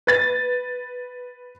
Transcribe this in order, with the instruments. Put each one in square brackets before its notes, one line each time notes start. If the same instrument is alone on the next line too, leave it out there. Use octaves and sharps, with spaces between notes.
[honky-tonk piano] B4 A6